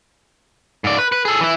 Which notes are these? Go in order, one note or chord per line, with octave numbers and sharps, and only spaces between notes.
G#2 D5
B4
B4
G#4 A4
E3 E4